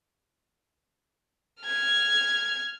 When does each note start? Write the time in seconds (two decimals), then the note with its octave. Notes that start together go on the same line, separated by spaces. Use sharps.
1.63 F6 G#6